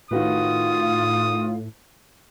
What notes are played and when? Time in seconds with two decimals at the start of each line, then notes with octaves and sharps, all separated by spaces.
0.11 A2 D#3 F4 F#4 B4 F5 D#6